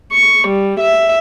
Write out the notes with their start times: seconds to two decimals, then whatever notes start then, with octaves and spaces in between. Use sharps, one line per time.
0.12 C#6
0.47 G3
0.80 E5